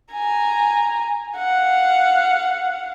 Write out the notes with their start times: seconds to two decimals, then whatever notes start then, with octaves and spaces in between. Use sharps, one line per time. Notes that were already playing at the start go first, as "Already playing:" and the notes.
0.13 G#5 A#5
1.37 F5 F#5